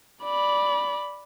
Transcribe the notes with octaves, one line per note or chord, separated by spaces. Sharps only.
D5 B5